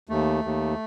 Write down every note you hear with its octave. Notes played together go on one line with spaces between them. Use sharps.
D#2 A3
D#2